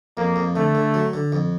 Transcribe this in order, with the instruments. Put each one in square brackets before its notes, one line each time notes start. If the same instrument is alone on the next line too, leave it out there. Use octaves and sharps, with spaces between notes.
[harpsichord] F2 [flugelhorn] A#3
[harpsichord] F2
[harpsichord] D3 [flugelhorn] A3
[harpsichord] D3
F#3
D3
F2